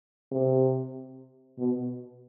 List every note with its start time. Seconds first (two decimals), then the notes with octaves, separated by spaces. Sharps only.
0.32 C3
1.58 B2